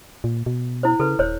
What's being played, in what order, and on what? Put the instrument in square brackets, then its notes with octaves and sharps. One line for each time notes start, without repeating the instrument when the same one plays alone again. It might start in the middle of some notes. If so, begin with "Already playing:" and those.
[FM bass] A#2
B2
[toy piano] E4 C5
[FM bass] C#3 [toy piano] A4 B4
[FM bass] D#1 [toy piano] C5 C#5